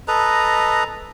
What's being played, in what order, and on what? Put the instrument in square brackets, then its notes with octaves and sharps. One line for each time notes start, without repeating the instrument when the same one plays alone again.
[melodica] A4 B4 D#5 A#5